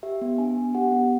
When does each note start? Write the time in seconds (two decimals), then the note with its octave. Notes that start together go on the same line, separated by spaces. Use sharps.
0.03 G4 E5
0.21 B3
0.38 D4 G#5
0.57 B3
0.75 G4 F#5
0.92 B3